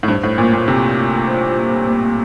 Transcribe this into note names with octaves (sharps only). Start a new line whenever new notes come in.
A2
G2 C5
A2
A#2 A#3
A#2
C3 A#3
F4
C5
A#3
A#3